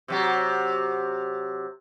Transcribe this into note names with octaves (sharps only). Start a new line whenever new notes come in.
C3 F#3 G4